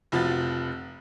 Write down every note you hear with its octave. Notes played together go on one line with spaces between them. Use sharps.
F1 F3 F#4 A6